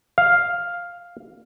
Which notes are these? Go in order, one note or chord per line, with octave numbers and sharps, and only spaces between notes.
F5